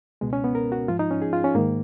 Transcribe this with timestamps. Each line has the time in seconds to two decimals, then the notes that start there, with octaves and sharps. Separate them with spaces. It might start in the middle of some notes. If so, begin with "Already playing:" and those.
0.21 C#2 B2 G#3
0.33 C#4
0.44 B3
0.55 A#4
0.72 F#4
0.88 G#2 F3 F4
0.99 D#4
1.11 C#4
1.22 G#4
1.33 F4
1.44 C#4
1.55 G#2 D#3 A#3